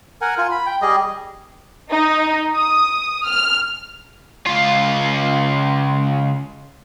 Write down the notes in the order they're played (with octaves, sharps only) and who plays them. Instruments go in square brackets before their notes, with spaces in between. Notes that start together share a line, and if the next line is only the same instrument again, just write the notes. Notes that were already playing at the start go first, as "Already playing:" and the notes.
[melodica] A#4 F#5 G#5
F4 G#5
B5
G5
G3 G#4 D#5
[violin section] D#4
D#6
F6
[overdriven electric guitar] C#2 F4